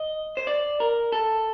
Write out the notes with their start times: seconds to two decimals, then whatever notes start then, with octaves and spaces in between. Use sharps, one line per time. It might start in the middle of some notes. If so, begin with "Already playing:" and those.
Already playing: D#5
0.37 C5
0.47 D5
0.80 A#4
1.12 A4